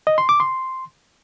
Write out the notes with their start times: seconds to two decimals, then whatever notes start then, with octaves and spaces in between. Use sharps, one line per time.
0.07 D#5
0.18 C6
0.29 D6
0.40 C6